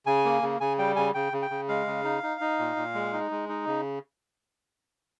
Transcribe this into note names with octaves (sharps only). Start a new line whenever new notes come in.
C#3 G#5
A#3
C#3
C#3 G#5
G3 G5
C#3 G#5
C#3 G5
C#3
G5
C#3
G#3 F5
C#3
D#4
D#4
D#4
A#2
A#2
G#3
D#4
G#3
D#4
C#3